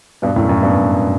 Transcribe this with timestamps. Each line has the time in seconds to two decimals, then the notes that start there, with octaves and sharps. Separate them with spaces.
0.22 G2 B2
0.36 F#2 A2
0.49 F#2 A2
0.62 G2 B2